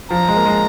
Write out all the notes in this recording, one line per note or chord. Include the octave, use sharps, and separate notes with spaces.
F3 A#5
G#3
A#3
G#3